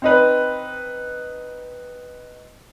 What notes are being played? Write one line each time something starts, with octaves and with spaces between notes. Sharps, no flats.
C4 D#4 B4